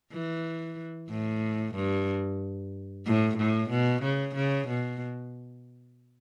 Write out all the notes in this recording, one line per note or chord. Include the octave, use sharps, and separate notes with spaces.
E3
A2
G2
A2
A2
B2
C#3
C#3
B2